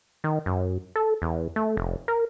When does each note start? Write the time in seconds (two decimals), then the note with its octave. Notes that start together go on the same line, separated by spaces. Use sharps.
0.24 D#3
0.46 F#2
0.96 A4
1.22 E2
1.56 A3
1.77 F1
2.08 A#4